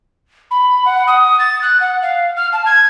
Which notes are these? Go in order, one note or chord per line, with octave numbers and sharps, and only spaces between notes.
B5
F#5
D#6
A6
F#6
F#5
F5
F6
A5
G#6